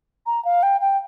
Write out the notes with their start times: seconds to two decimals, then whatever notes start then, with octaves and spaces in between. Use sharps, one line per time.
0.26 A#5
0.45 F5
0.63 G5
0.81 G5